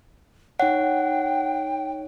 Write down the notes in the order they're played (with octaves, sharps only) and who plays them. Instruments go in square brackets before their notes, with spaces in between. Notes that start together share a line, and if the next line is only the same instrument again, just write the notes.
[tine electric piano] D#4 C#5 [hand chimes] F#5 [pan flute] G5